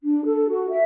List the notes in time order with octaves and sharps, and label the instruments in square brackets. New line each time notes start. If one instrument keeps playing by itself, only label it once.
[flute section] D4
A4
F#4
E5